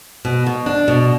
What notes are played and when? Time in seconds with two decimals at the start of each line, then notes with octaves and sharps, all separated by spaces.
0.25 B2
0.46 B2
0.66 D4
0.88 B2